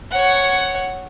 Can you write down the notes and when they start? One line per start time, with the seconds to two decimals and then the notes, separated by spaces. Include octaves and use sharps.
0.12 C#5 F#5